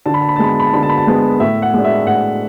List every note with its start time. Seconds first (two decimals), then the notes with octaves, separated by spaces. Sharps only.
0.06 D3 A5
0.14 B5
0.21 A5
0.29 B5
0.36 A5
0.39 G#3 B3 B5
0.52 A5
0.60 B5
0.67 A5
0.74 D3 B5
0.83 A5
0.89 B5
0.98 A5
1.07 G#3 B3
1.40 A2 E5
1.62 F#5
1.74 G#3 D4
1.84 E5
2.07 A2 F#5